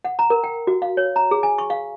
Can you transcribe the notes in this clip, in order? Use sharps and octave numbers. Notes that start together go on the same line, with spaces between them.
F#5
A#5
A#4
G5
F#4
F5
C#5
A#5
G#4
G#5
C#6
F5